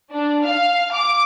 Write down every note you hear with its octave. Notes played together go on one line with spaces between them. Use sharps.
D4
F5
D6